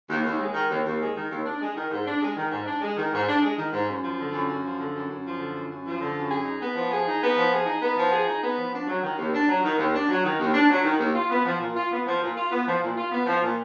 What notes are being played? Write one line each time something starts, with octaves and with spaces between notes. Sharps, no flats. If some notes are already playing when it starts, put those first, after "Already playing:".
D#2
D#2
G#3
D#3
D#2
D#2
G#3
D#3
D#2
D4
G#3
D#3
G#2
D4
G#3
D#3
G#2
D4
G#3
D#3
G#2
D4
G#3
D#3
G#2
F#2
F3
D3
F#2
F#2
F3
D3
F#2
F#2
F3
D3
F#2
F#2
F3
D3
F#2
G#4
D#4
B3
F3
G#4
D#4
B3
F3
G#4
D#4
B3
F3
G#4
D#4
B3
F3
D4
F#3
D#3
D#2
D4
F#3
D#3
D#2
D4
F#3
D#3
D#2
D4
F#3
D#3
D#2
F4
B3
F3
A#2
F4
B3
F3
A#2
F4
B3
F3
A#2
F4
B3
F3
A#2